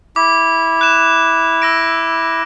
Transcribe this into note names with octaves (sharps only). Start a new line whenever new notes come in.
E4 D6
F#6 E7
E6 A#6 D7